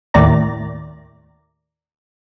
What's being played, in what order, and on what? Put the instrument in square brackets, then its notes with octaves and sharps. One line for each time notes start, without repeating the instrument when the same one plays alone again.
[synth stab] D#2 A2 D5 A#5